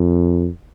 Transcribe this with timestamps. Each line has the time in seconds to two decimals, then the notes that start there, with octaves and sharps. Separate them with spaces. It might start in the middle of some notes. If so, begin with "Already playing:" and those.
Already playing: F2